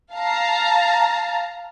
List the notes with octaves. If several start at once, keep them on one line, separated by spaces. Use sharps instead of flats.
F5 A5 A#5